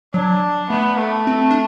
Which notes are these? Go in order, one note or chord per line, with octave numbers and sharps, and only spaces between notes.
F#3 D4
A3 B3
A3
C4
D4